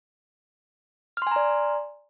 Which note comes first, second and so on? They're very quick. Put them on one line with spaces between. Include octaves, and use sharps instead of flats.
F6 C6 G#5 A#5 D5